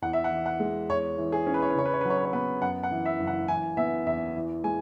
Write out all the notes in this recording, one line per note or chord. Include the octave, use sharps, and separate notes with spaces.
E2 F#5
E5
F#5
E3
F#5
G#3
E2 C#5
E3
G#4
C#4
B4
C#5
B4
C#3 C#5
B4
C#5
B4
F#3 C#5
B4
C#5
B3 B4
F#2 F#5
F#5
E3
E5
F#1
F#5
E3 G#5
B3 E5
E2 E5
E3
G#3 G#5